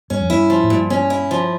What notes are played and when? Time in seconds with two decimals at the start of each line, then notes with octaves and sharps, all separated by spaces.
0.10 G2 C#4
0.20 F2
0.30 G2 E4
0.50 F3
0.64 A2
0.70 G2 A#2
0.90 C#4
1.10 E4
1.31 F3